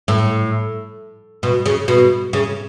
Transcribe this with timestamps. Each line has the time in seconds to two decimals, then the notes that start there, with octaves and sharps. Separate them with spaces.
0.08 A2
1.43 B2
1.66 C#3
1.88 B2
2.33 C#3